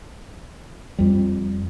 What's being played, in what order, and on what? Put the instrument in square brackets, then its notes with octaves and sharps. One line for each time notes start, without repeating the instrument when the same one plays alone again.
[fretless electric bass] F2 G3